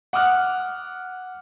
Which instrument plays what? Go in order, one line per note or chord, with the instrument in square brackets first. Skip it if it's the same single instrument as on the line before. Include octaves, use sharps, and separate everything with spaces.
[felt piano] F#5 D6 D#6 F6 F#6